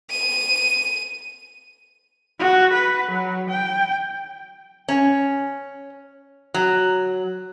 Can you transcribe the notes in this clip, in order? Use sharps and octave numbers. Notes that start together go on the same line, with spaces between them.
D#7
F#4
B4
F#3
G5
C#4
F#3